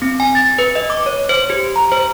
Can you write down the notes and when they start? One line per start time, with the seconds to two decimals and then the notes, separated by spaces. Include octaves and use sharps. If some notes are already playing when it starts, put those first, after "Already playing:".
0.02 C4
0.20 G#5
0.35 A6
0.59 B4
0.75 D#5
0.90 D6
1.06 C#5
1.29 C5
1.50 G4
1.76 A#5
1.92 C5